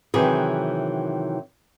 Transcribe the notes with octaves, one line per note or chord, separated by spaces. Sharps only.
C3 D#3 E3 F#3 G#4